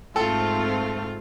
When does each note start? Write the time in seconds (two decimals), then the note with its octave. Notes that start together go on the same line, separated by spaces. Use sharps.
0.16 G#2 A3 C4 F4 A4